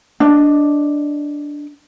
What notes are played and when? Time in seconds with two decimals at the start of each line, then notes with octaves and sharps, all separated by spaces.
0.20 D4 D#5